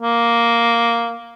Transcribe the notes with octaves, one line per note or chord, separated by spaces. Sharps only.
A#3